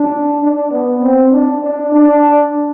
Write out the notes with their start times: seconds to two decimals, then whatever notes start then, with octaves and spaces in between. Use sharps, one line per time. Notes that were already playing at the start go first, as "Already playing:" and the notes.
Already playing: D4
0.41 D4
0.71 B3
1.01 C4
1.32 D4
1.62 D4
1.92 D4